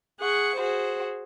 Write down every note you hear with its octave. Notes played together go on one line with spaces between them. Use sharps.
G#4 F#5 C#6
F#4 G#4 C5